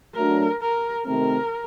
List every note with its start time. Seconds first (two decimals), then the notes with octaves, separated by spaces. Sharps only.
0.15 F#3 A3 D4 A#4
0.61 A#4
1.05 C3 D#3 A3 C4 A#4